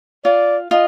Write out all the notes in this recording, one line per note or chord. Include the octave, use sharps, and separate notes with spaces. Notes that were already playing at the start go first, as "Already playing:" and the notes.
F4 D5
F4 D#5